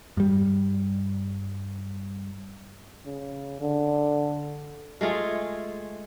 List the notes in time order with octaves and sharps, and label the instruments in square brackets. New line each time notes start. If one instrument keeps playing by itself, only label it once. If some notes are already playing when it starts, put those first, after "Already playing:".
[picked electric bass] G2 G3
[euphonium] C#3
D3
[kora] G#3 A3 F4 G#4